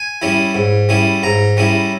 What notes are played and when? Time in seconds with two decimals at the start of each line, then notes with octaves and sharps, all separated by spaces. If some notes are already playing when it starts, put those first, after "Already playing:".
Already playing: G#5
0.22 G3 C#4 E4
0.55 G#2
0.89 G3 C#4 E4
1.23 G#2 A#5
1.57 G3 C#4 E4